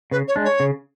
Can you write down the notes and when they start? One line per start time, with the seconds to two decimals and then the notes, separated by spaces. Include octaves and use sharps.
0.11 C#3 B4
0.27 C#5
0.36 G#3 D4
0.44 C#5
0.60 C#3